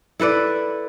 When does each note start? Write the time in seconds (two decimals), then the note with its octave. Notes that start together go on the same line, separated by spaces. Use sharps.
0.20 E4 A4 B4 D5